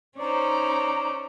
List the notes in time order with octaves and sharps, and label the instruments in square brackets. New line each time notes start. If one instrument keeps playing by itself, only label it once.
[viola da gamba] C#4 D#4 C5 [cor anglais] D5 [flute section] A#5